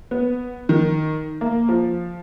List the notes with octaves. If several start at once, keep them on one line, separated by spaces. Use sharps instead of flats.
B3
D#3
A#3
F3